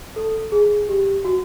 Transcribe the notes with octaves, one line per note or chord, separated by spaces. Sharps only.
A4
G#4
G4
F#4